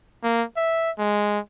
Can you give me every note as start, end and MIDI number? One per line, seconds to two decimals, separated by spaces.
0.24 0.43 58
0.57 0.91 76
0.99 1.39 56